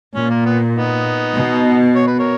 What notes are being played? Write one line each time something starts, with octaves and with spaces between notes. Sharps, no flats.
A#2 C#4
A#3
B3
B3 D#4
B2
C#5
B4
A#4 C#5